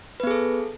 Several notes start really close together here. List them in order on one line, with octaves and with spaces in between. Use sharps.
B4 B3 G#4 A4